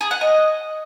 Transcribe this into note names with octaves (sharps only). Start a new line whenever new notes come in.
G#4
F#5
D#5